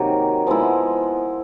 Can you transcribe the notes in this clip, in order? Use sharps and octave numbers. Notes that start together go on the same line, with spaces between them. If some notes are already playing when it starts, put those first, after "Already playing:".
Already playing: C3 D#3 F#3 A#3
F3 G#3 B3 E4